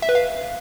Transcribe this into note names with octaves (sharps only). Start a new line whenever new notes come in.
E5
B4
F5